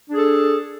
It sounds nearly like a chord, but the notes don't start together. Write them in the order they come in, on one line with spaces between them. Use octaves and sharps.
D4 G#4 A4